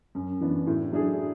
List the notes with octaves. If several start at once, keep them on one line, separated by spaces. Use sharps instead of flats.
F#2
E3 B3 D4
A2
F#3 A3 D4 G#4